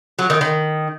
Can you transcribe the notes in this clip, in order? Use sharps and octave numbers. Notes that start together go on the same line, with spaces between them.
F#3
D#3
D#3